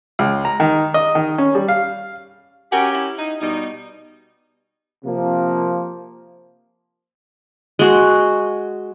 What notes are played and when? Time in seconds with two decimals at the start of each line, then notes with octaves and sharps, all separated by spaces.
0.19 C#2
0.45 A#5
0.60 D#3
0.94 D#5
1.15 D#3
1.38 C#4
1.55 G3
1.68 F5
2.72 C#4 F#4 G4 A#4 G#5
2.95 E4
3.18 D#4
3.41 B2 G3 D#4
5.05 C3 F3 A#3
7.79 G#3 F#4